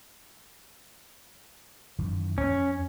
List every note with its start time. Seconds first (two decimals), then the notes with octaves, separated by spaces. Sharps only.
1.99 F#2 D#3 E3
2.38 F2 C#4